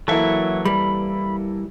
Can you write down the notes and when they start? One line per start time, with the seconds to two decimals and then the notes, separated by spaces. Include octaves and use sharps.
0.08 E3 F#3 A#3 E4 A4 E5
0.65 G3 B5